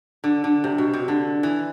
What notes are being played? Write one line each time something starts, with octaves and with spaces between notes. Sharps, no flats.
D3
D3
C3
B2
C3
D3
E3